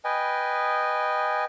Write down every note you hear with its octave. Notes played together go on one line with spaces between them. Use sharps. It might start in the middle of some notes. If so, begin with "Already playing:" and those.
B4 D#5 G5 G#5